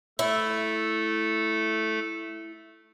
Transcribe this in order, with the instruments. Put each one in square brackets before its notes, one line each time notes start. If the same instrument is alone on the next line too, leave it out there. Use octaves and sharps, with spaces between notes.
[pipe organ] A3 A4 [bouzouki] E4